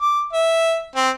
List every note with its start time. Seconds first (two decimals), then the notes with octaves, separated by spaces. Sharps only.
0.01 D6
0.33 E5
0.96 C4